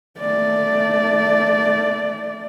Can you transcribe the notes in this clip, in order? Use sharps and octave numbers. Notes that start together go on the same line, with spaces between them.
A3 D5